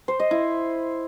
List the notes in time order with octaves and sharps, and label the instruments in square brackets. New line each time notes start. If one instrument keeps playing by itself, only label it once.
[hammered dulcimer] C5
D#5
E4